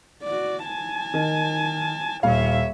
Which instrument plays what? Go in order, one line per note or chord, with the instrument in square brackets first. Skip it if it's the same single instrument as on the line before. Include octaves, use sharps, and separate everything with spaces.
[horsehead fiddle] F#4 D5
G#5 A5
[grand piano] D#3
[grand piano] D#1 F5 [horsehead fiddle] C#5 E5